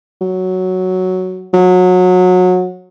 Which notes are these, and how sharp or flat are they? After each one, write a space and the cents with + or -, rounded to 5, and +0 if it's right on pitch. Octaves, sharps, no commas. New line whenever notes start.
F#3 +0
F#3 -25